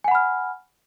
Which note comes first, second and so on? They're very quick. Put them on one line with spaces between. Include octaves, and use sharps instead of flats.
G#5 F#5 B5 F6